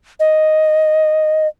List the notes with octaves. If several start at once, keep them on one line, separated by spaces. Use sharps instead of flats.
D#5